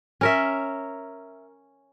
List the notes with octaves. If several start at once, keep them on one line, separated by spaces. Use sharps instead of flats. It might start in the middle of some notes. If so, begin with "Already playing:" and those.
C#4 A#4 E5